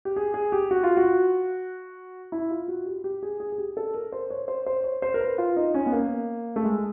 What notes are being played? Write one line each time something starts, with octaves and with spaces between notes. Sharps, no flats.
G4
G#4
G#4
G4
F#4
F4
F#4
E4
F4
F#4
G4
G4
G#4
G#4
G#4
G4
A4
A#4
C5
C#5
C5
C5
C#5
C5
A#4
B4
F4
D#4
C#4
B3
A#3
A3
G#3